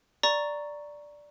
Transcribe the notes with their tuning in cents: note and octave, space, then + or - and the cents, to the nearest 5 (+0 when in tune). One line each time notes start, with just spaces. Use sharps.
D5 +0 A#5 +0 C#6 +0